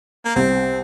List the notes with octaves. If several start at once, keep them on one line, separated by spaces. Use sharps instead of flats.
A#3
C2 C4